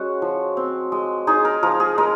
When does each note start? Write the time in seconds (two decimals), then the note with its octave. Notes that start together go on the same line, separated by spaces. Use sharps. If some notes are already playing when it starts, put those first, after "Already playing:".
Already playing: G#3 C#4 F#4
0.22 F3
0.57 C4
0.92 G#3
1.27 D#4 G#4
1.45 A#4
1.63 F3 A#4
1.80 G#4
1.98 G#3 A#4